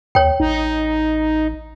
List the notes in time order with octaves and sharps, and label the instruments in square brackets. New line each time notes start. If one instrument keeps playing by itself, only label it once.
[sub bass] D#2 [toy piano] C#5 G5
[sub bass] A1 [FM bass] D#4